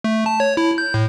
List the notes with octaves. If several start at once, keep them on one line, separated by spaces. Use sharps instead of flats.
A3
A5
C#5
E4
G6
A2